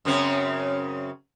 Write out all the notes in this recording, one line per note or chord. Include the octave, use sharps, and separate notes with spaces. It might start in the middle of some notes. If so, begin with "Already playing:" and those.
F#2 C#3 C4